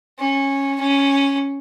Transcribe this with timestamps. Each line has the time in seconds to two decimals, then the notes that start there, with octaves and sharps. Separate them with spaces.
0.19 C#4
0.80 C#4